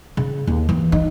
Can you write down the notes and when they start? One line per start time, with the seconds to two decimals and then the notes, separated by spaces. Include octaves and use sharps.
0.17 C#3
0.47 D#2
0.69 E3
0.92 D#4